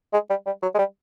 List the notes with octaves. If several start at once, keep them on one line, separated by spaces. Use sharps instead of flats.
G#3
G3
G3
F#3
G#3
G3